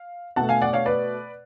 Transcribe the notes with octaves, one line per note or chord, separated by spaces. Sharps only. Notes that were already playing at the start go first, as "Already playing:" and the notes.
Already playing: F5
B2 A3 F#5 A5
F5 G#5
D5 F#5
C#5 F5
B4 D5